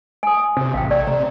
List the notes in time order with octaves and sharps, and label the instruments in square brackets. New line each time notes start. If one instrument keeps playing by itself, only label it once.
[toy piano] G#5 A5 D#6
[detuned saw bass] C3
[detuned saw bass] A1 [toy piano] F5 G5
[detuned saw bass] A3 [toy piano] D5
[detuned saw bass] C3 [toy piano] A#5